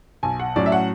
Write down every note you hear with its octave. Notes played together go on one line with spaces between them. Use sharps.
B1 G#5
F#5
A2 F#3 C#4 D5
E5
F#5